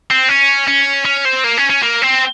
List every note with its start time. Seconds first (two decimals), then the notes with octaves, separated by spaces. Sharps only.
0.11 C4
0.29 C#4
0.68 C#4
1.05 C#4
1.25 C4
1.44 A#3
1.58 C#4
1.70 C#4
1.83 A#3
2.02 C4